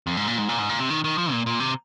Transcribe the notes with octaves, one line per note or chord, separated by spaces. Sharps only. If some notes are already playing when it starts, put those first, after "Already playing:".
F2
G#2
A#2
G#2
A#2
G#2
A#2
C3
D#3
D#3
F3
A#2
A#2
C3